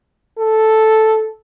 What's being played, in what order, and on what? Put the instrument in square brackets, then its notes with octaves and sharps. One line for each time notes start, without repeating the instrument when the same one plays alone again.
[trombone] A4